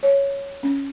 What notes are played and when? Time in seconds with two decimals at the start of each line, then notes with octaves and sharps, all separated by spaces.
0.03 C#5
0.63 C#4